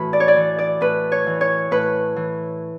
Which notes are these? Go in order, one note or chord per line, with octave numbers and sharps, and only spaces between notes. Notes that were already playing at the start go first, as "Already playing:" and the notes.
Already playing: A2 E3 F#4 B5
D5
C#5
D5
E3
D5
A2 B4
C#5
E3
C#5
A2 B4
E3